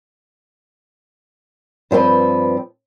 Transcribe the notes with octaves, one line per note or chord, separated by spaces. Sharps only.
G2 F3 G#3 C4 B4